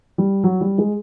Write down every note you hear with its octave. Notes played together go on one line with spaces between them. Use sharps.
G3
F#3
G3
G#3